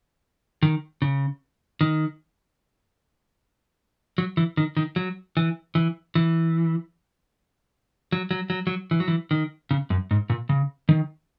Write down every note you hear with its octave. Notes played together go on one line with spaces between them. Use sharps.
D#3
C#3
D#3
F#3
E3
D#3
D#3
F#3
E3
E3
E3
F#3
F#3
F#3
F#3
E3
F#3
E3
D#3
C#3
F#2
G#2
A#2
C#3
D#3